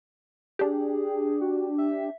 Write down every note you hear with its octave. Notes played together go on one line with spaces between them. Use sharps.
D4 G4 G#4
F#4
E5